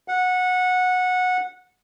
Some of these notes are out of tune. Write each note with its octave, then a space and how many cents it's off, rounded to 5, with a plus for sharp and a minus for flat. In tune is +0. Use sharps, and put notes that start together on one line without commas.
F#5 -15